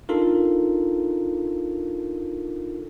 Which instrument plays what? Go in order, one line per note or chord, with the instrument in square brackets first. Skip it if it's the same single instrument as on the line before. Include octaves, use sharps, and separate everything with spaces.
[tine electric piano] D4 D#4 F4 A4 A#4